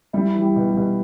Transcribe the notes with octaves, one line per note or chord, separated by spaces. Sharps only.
G3 E4
E3
G3
B2
G3
B2